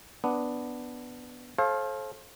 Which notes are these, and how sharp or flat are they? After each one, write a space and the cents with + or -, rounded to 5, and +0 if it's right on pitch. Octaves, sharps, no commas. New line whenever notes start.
B3 +0 D4 +0
A4 -30 C5 +40 F5 -5